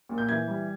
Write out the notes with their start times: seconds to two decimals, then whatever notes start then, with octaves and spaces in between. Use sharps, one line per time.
0.09 A#2
0.18 G6
0.29 E3 G#6
0.48 G3